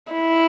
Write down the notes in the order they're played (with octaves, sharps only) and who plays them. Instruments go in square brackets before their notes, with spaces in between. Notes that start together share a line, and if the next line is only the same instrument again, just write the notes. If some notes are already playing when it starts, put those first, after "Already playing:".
[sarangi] E4